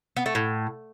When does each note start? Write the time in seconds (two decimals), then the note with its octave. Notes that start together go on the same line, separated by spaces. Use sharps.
0.16 B3
0.26 A3
0.35 A2